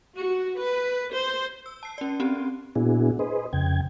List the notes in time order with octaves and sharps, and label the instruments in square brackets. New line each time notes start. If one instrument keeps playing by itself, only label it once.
[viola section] F#4
B4
C5
[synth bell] E6
A5 C7
C#4 D5
C4 C#4 G4
[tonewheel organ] A#2 B3 D4 E4 F#4 G#4
G#4 B4 C5 D#5
F2 C#3 G5 G#6